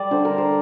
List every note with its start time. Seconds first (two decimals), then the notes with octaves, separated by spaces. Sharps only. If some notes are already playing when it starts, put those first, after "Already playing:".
Already playing: G3 D5
0.11 D3 C5
0.25 A#4
0.38 C5